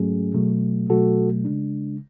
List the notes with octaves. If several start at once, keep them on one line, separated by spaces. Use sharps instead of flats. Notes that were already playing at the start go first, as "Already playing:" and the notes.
Already playing: G#2 F#3 A3 C#4 G#4
B2 F#3 A3
B2 F#3 A3 F#4 A4
C#3 G#3 D4